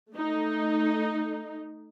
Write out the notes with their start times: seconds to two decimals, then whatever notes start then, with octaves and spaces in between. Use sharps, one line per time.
0.12 A3 D#4